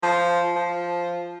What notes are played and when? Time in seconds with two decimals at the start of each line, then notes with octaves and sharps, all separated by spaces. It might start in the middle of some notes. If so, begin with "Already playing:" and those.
0.03 F3
0.56 F3